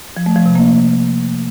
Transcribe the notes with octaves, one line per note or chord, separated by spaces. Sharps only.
F3
A3
F3
C3
A#3